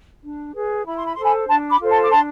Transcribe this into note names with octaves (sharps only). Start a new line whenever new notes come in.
D4
G#4 B4
E4 B5
C6
B5
A4 C5 C6
G#5 B5
D4 A5 C6
B5 D6
F4 A4 C5
A5 C6
D6
D4 A5 C6